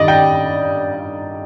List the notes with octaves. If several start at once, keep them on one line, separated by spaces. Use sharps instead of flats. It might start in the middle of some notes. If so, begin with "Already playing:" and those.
Already playing: G2 D#3 G3 D5 D#5
G5